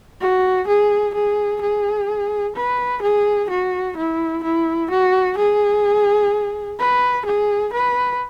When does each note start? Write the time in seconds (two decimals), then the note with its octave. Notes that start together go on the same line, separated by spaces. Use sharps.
0.21 F#4
0.67 G#4
1.15 G#4
1.62 G#4
2.56 B4
3.02 G#4
3.50 F#4
3.97 E4
4.44 E4
4.91 F#4
5.38 G#4
6.79 B4
7.26 G#4
7.73 B4